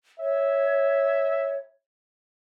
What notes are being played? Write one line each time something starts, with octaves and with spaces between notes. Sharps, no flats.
C#5 E5